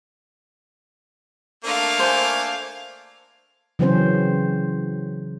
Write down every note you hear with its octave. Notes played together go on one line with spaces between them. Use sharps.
A3 A#3 D4 F5
C5 G#5
C#3 E3 F#3 C4 C#4 C5